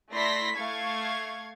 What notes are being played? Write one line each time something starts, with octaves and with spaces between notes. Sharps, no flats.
A3 E4 D5 C6 A#6 B6
A3 F5 C#6 G#6